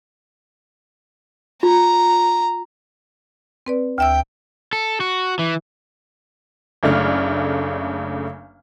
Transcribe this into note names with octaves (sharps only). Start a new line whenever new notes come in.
F4 A#5
C4 B4 D5
D2 E5 G5 E6
A4
F#4
E3
F#1 C#3 A3 D4 F6